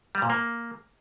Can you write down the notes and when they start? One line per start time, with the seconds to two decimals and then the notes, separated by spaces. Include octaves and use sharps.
0.15 G3
0.22 A#2
0.30 A#3